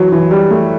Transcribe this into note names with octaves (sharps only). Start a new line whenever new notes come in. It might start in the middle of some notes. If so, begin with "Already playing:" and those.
Already playing: E3 F#3
E3
G3
A3